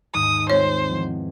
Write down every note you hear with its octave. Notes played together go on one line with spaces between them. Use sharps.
D#2 G#2 D#6
G#3 C4 F4 C5 C#5
E2 F3